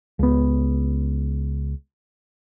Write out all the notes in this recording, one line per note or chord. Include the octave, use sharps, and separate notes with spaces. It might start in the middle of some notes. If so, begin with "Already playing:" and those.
C#2 B3